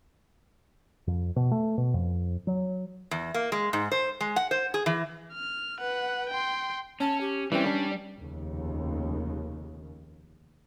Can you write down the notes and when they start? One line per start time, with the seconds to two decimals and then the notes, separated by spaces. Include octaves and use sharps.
1.07 F2
1.36 B2
1.52 A3
1.78 B2
1.94 F2
2.47 F#3
3.11 E2
3.34 A#3
3.52 G#3
3.73 G#2
3.92 C5
4.21 G#3
4.36 F#5
4.51 C5
4.74 G#4
4.86 E3
5.33 F6
5.80 B4 F#5
6.29 G5 C6
7.01 C#4 A5
7.21 G4
7.52 E3 G3 C4 C#4
7.66 D4
8.18 F1 D#2 C#3